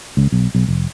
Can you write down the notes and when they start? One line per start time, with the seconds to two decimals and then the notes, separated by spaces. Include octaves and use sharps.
0.17 C#2
0.32 B1
0.55 B1
0.68 F1